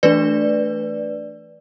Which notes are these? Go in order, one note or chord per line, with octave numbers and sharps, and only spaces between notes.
E3 A3 D4 B4 D5